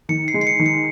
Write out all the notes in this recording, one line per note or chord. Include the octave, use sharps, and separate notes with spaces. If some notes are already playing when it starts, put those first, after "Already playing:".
D#3 C#7
C7
G#3
C7
C#7
D#3
C#7